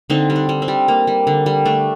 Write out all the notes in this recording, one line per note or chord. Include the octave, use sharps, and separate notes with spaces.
D3 C4 D#4
G3
D4
G3
C4
G3
A#3
G3
D3
G3
A3 D4